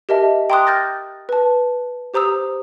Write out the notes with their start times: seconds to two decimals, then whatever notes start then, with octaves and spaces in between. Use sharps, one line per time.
0.09 G4 A#4 D#5 E5 A5
0.50 G5 A#5 C6 D6 D#6 F#6
0.67 F6 G6 A6 A#6
1.29 B4 A5
2.14 G4 C5 A#5 D#6 E6